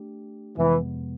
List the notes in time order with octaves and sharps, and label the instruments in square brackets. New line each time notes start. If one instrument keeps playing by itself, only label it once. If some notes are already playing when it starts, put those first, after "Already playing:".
Already playing: [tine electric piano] A3 D4 G4
[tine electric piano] F2 C3 F3 G#3 B3 [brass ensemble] E3